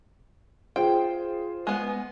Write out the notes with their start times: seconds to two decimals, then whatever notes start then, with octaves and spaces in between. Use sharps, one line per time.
0.76 F4 G#4 C5 G5
1.67 G#3 B3